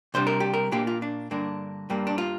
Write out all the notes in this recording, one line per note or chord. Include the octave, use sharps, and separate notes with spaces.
C3 G3 D4 C5
A#4
G4
A#4
A#2 A#3 D4 G4
F4
D4
G2 D3 A#3 D4
G2 G3 A#3
D4
F4